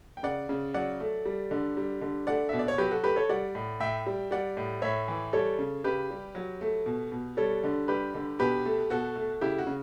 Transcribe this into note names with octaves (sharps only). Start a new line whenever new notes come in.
G5
C#3 D5 F#5
C#3
F#3 D5 F#5
A3
G3
D3
G3
D3
A3 D5 F#5
B2 E5
D5
C#5
F#3 G4 B4
F#4 A4
A3 G4 B4
A4 C#5
G3 D5 F#5
A2
A2 E5 G5
G3
G3 D5 F#5
A2
A2 C#5 E5
E3
G3 A4 C#5
C#3
C#3 G4 B4
G3
F#3
A3
B2
B2
G3 A4 C#5
D3
G3 G4 B4
D3
B2 G4 B4
A3
B2 F#4 A4
A3
C#3 E4 G4
F#4
C#3